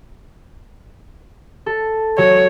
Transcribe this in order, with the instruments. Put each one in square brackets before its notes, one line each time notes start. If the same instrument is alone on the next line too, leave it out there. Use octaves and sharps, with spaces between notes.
[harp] A4
[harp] F#3 [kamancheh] C#5